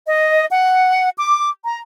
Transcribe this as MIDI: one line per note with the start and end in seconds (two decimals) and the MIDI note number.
0.07 0.46 75
0.50 1.10 78
1.18 1.48 86
1.65 1.79 82